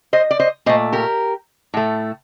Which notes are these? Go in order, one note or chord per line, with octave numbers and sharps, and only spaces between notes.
C5 D#5
D5
C5 D#5
A#2 A3 C5 D#5
G4 A#4
A2 A3